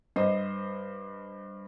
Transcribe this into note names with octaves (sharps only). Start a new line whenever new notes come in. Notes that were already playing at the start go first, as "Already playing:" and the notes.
G2 C5 D#5